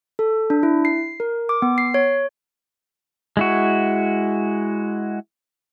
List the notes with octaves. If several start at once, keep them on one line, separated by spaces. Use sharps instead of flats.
A4
D4
E4
C7
A#4
D6
B3
C7
C#5
G#3 E4 F#4